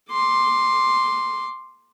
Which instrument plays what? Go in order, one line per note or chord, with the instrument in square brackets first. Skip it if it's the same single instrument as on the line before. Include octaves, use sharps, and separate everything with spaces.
[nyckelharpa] C6 D6